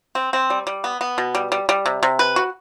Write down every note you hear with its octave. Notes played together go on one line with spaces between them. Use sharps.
C4
C4
G3
G3
B3
B3
B2
G3
G3
G3
C3
C3
B4
F#4